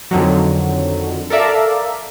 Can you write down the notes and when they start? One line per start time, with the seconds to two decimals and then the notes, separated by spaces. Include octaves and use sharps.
0.11 F2 D3 D#3 F#3
1.30 A4 A#4 D5 E5 F5